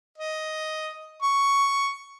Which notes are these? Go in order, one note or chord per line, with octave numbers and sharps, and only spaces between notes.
D#5
C#6